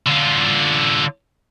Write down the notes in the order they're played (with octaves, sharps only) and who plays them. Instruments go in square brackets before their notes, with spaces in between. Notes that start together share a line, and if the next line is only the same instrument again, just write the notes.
[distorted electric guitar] D3 F4